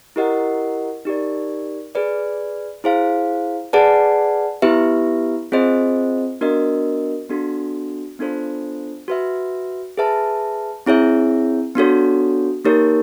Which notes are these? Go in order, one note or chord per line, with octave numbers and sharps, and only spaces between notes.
E4 G4 A#4 D#5 F#5
D#4 G4 A#4 D5
G#4 B4 D5
E4 G#4 C5 F5
G#4 B4 D5 F#5 A5
B3 E4 G4 B4 E5
C4 F4 G#4 C5 D#5
B3 D4 F#4 A#4 D#5
B3 D4 F#4 A4
B3 D4 F4 A4 C5
F#4 B4 E5
G#4 B4 E5 A5
C4 E4 G#4 C#5 E5
B3 D4 F#4 A4 C#5
A#3 D#4 G4 A#4 C#5